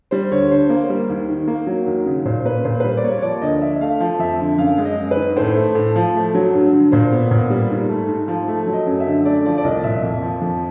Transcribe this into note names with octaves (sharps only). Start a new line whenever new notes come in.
G3 C5
D2 C#5
D3 C5
A#3
G3
D#2
D#3
A#3
F#3
D#2
C#3
A#2 C5
A#3 B4
A#2 C5
B4
G3 C5
D5
A#3 C#5
C#5
F3 D5
D2 D#5
D3 E5
A3 F5
F3
F2 E5
D3
F#2 F5
G#3
D#5
F#2
B4
D#3
A2 C5
A3
A2
F3
A3
F#3
G2
D3
A#2 C5
B3
A#2
G3
G#2
A3
G#2
F3
A3
F#3
D#5
F#2
E5
D3
A3 D5
F3 D5
D5
C2 D#5
A#2 E5
F2
F3
F2